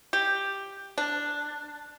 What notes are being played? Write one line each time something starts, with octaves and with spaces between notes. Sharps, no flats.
G4
D4